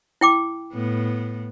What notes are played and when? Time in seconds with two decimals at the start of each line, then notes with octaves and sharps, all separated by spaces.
0.21 E4 G5 D6
0.73 A2 B3